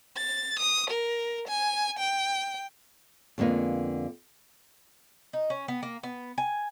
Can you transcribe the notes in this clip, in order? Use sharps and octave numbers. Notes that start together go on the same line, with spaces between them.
A6
D#6
A#4
G#5
G5
F2 D3 G#3 A#3 B3
D#4
C#4
B3
A#3
B3
G#5